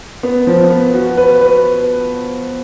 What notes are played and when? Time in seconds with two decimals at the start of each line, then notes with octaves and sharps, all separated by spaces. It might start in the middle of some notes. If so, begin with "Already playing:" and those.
0.23 B3
0.47 F3
0.70 B3
0.94 F#4
1.18 B4
1.41 B4